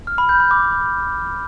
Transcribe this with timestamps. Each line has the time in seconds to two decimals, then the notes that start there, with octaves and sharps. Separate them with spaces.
0.07 F6
0.18 B5
0.29 G6
0.40 B5
0.51 D6